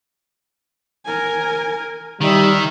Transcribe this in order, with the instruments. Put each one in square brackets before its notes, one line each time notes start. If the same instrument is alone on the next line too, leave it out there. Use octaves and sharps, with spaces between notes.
[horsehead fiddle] A#4 G#5
[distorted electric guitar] D#3 [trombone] G3 [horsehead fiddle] D#4 E5